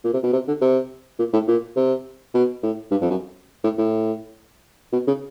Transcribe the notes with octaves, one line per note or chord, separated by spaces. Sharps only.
A#2
C3
B2
C3
D3
C3
A#2
A2
A#2
C3
B2
A2
G2
F2
F#2
A2
A2
B2
C#3